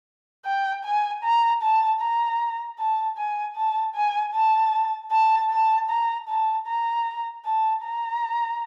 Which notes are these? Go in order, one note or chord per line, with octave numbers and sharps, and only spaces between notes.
G5
G#5
A#5
A5
A#5
A5
G#5
A5
G#5
A5
A5
A5
A#5
A5
A#5
A5
A#5